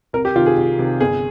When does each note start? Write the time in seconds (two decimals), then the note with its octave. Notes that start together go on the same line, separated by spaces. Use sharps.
0.13 C2 A#4
0.25 G4
0.35 C3 D#3 F4
0.46 G#4
0.57 C2
0.78 C3 D#3
1.00 G1 G#4